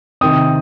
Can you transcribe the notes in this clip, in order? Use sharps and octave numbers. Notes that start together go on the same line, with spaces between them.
C3 D#3 C4 D#6